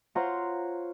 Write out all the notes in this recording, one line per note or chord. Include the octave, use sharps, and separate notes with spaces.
F4 C5 C#5 F#5 A#5